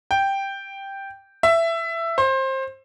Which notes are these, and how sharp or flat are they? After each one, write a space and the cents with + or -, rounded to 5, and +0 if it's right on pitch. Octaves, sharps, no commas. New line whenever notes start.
G5 +0
E5 +15
C5 +25